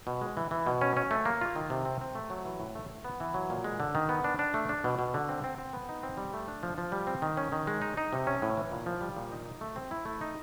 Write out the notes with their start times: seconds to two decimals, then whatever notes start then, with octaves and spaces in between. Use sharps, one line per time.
0.07 B2
0.21 G#3
0.37 E3
0.51 E3
0.66 B2
0.81 C#4
0.97 C#4
1.11 A3
1.26 A#3
1.41 F4
1.56 D#3
1.70 C3
1.85 C4
2.01 C4
2.15 A3
2.30 F#3
2.45 E3
2.60 A2
2.75 A3
2.90 A3
3.04 B3
3.20 E3
3.34 F#3
3.50 A#2
3.64 G#3
3.80 D3
3.95 D#3
4.09 B3
4.24 D4
4.39 D4
4.54 A3
4.69 D4
4.84 B2
4.99 B2
5.14 D3
5.29 C4
5.44 C4
5.58 C4
5.73 B3
5.89 D#4
6.03 C4
6.17 G3
6.34 A3
6.48 D4
6.63 F3
6.78 F3
6.92 G3
7.07 C4
7.22 D#3
7.37 C#4
7.52 D#3
7.67 G#3
7.82 D#4
7.97 D#4
8.13 C3
8.27 C#4
8.42 A2
8.57 E3
8.72 A#2
8.86 F3
9.01 G3
9.16 A#2
9.32 D#4
9.46 D#4
9.61 A3
9.76 C4
9.91 E4
10.05 A3
10.21 D#4